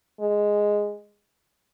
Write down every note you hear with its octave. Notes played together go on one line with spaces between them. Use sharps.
G#3